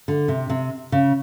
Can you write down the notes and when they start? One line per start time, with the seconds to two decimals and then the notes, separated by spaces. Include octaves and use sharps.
0.08 D3
0.28 C3
0.50 C3
0.92 C#3